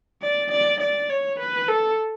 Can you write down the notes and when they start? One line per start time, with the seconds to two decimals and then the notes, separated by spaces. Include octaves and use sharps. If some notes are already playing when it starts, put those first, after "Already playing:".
0.22 D5
0.51 D5
0.80 D5
1.09 C#5
1.39 B4
1.68 A4